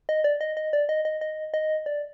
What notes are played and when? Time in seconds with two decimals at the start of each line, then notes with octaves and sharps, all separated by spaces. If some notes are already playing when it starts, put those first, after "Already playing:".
0.09 D#5
0.24 D5
0.41 D#5
0.57 D#5
0.73 D5
0.89 D#5
1.05 D#5
1.21 D#5
1.54 D#5
1.86 D5